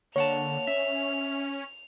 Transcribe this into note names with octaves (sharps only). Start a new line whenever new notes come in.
D3 A#3 C#5 F#5 A5 F7
C#4 E5